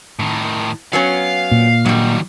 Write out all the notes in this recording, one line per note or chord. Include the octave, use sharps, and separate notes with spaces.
A2 D#3
F#3 B3 C#4 F5
A#2
G2 D#3 F#3 G3